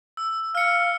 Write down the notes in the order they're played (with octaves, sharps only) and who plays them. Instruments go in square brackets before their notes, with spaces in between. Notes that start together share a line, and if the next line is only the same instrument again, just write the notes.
[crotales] E6
[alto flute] F5 [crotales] F6 C#7